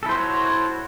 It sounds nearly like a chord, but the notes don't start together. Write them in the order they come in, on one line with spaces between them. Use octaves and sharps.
A4 E4 C5 F#4 C#5